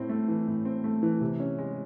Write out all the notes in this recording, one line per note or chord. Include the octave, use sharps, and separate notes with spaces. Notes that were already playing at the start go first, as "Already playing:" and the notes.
Already playing: A2 C4
A3
E3
A2
C4
A3
E3
C3
C#4
G#3